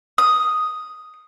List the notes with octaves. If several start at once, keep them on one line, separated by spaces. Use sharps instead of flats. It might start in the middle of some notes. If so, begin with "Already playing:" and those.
D#6